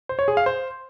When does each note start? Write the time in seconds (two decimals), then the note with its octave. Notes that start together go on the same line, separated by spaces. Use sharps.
0.09 C5
0.19 C#5
0.28 G#4
0.37 F5
0.46 C5